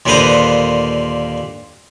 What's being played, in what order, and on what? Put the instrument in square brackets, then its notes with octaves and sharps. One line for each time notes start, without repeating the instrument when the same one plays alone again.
[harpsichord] D#2 A#2 D3 B4 C5 D#6